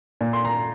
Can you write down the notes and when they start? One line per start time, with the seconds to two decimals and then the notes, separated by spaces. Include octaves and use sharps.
0.21 A#2
0.33 C6
0.45 A#5